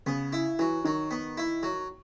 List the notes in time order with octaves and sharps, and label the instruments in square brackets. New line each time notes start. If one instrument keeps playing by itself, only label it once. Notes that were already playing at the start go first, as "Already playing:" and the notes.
[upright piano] C#3 [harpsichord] B3
[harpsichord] E4
[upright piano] E3 [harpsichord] F#3
[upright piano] D#3 [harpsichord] F#3
[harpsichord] B3
E4
F#3